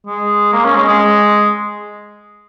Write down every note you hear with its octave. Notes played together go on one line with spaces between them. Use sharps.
G#3
A#3
C#4
G#3
G#3